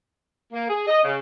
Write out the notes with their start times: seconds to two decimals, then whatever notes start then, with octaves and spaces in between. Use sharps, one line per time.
0.53 A#3
0.69 G#4
0.87 D#5
1.04 C#3